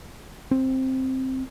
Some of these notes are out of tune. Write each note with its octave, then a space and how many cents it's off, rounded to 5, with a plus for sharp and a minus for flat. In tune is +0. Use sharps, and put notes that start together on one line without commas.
C4 +5